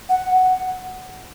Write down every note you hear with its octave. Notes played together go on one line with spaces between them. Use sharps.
F#5